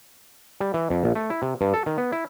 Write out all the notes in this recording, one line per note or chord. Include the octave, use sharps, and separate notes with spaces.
G3
E3
F2
A#1
A3
E4
C3
G2
A4
D#3
B3
E4